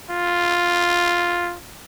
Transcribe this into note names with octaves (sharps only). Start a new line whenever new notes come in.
F4